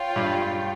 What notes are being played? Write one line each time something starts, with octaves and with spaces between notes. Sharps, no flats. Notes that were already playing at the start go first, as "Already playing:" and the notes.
Already playing: F4 C#5 G5
G2